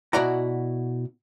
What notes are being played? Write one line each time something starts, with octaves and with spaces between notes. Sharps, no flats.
B2 E4 F#4 D5 F#5 A#5